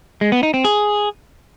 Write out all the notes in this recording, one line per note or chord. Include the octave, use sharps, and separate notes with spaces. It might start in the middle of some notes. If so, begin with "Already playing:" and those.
G#3
B3
D#4
C4
G#4